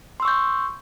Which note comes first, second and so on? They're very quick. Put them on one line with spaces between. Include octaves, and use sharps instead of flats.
C6 E6 C#6 G6